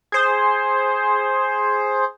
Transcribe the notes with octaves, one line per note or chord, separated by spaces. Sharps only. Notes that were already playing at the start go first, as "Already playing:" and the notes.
G#4 C5